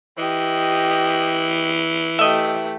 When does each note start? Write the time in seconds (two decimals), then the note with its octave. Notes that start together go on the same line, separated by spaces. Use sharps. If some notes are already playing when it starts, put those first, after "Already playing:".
0.18 E3 G4 D#5
2.19 A3 G4 D#5 E5